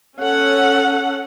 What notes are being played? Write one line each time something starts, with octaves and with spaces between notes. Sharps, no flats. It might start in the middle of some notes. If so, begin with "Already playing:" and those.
C#4 A4 F#5